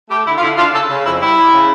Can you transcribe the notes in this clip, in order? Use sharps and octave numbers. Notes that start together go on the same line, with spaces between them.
A3 G4
D3 E4
F4
D3 E4
D4 F4
C#3 A4
C#3
F2 E4
G3 E4
G3
C#3